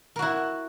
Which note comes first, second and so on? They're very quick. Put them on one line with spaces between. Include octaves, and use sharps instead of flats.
A#4 F#4 E4